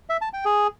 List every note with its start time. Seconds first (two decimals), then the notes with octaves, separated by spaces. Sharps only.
0.09 E5
0.21 A5
0.33 G5
0.45 G#4